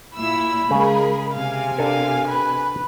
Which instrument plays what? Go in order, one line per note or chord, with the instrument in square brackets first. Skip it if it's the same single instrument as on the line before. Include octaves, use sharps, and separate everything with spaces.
[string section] A#2 E4 E6 [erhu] B5
[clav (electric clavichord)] C#3 [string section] G#3 G#4 A#4
[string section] C3 G#5 [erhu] F5
[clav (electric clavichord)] D4 A4 A#4 [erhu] F5
[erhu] B4